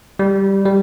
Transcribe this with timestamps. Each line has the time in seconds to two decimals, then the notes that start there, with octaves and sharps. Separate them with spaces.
0.19 G3
0.65 G3